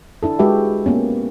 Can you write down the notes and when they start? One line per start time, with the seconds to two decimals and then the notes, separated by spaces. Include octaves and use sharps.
0.23 D4 E4 A4
0.39 G#3 F#4 G4 B4 E5
0.86 A#3 B3 C#4